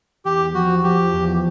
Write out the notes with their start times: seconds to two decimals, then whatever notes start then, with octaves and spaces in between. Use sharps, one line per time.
0.25 E2 G4
0.54 F3 F#4
0.83 F3 G4
1.13 E2